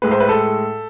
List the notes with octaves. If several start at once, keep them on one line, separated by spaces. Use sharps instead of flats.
A2 G#3 B4
C5
B4
A4